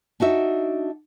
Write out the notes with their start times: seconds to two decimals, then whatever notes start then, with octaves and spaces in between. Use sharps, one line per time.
0.20 D4 D#4 F#4 E5